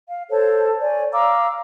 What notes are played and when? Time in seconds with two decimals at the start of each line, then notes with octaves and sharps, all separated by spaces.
0.07 F5
0.31 A4 C5 C#5 A5
0.81 C#5 D5 G#5
1.13 F5 A#5 D6 E6